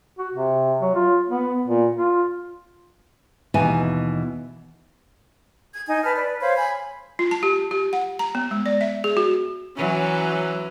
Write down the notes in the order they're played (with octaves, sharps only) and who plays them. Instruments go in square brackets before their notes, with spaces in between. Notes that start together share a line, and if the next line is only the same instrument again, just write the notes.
[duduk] F#4
C3
F#3
F4
B3
A#2
F4
[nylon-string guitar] D#2 B2 E3 G4 G#5
[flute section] G#6
D#4 G#5 G#6
B4 A5 F6
B4 D5
C5 C#5 F5 B5
G#5 B5
[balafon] F4
A5
G4
G4
F#5
A#5
B3
G#3
D5
E5
G#4
F#4
[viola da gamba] E3 F#3 C#4